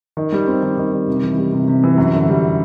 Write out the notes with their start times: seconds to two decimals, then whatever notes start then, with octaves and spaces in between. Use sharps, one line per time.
0.17 D#3
0.32 G3
0.47 C4
0.63 D#3
0.78 D#3
0.92 G3
1.07 C3
1.23 E3
1.38 G3
1.52 C3
1.68 C3
1.84 E3
1.98 F#2
2.13 D3
2.28 G3